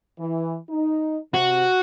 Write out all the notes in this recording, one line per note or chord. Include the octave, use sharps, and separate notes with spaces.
E3
D#4
C3 F#4